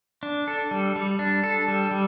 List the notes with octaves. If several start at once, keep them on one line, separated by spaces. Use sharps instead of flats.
D4
A4
G3
G3
D4
A4
G3
G3